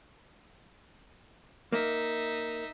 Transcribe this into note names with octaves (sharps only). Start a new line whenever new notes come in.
A#3 D#4 E5